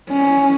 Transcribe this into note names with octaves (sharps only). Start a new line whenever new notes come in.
C#4